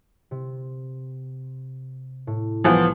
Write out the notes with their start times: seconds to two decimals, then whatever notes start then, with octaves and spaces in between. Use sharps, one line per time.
0.31 C3
2.27 A2
2.64 C2 E3 F3 B3 B6